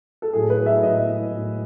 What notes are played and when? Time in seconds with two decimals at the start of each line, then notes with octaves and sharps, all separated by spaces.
0.22 A4
0.33 A2 F#3 G#4
0.50 B4
0.66 E5
0.82 A2 F#3 D#5
1.31 A2 F#3